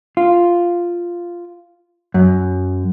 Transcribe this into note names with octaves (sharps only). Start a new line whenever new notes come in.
F4
F#2